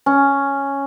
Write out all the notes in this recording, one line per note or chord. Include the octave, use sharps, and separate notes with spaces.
C#4